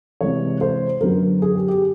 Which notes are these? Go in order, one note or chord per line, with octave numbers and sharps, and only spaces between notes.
C3 E3 G#3 C#5
C5
F#2 D3 F#3 B3 A#4
G#4
G4
G4